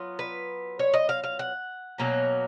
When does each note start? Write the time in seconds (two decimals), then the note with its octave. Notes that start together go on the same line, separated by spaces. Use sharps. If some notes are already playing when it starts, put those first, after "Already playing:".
Already playing: F#3 B3 F4
0.19 B4
0.79 C#5
0.94 D#5
1.09 F5
1.24 F5
1.39 F#5
1.98 B2 F#3 A#3 C#4